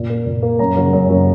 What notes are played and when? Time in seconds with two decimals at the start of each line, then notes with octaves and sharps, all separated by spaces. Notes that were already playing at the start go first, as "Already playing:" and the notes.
Already playing: A#2
0.10 A#3
0.26 A#2
0.43 A#3
0.59 F#2 A#5
0.76 C#3 F#3 A#3
0.93 F#2
1.09 C#3 F#3 A#3